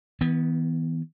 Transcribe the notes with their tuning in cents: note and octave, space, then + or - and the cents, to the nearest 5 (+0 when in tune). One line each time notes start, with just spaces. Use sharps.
E3 -35 B3 +5